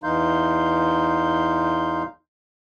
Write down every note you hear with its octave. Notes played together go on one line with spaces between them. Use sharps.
E2 E3 D#4 F5 C6 G6